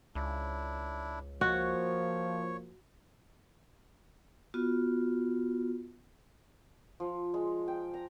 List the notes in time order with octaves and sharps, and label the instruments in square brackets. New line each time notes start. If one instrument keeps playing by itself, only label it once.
[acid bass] C#2 [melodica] D4 E4
[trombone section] F3 A#3 [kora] F#4 [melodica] C#5
[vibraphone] B3 F4 F#4
[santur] F3
G#3
G5
A#5